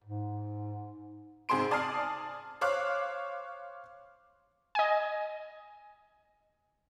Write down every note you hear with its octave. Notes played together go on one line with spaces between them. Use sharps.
G#2
G#2 C3 G#4 C5 C6 D7
D5 G#5 A5 D#6 F6 C7
C5 C#5 F5 D6 F6 F#6
D#5 G#5